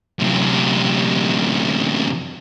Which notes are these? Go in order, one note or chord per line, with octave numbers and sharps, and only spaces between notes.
F#2 C3